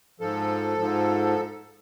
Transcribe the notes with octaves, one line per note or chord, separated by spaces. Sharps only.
G#2 F3 A4
G#2 F3